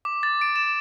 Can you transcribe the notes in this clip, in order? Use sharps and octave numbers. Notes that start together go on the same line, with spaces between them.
D6
A6
D7
E7